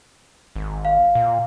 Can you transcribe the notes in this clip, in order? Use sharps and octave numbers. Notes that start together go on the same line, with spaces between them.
G#1
F5
A#2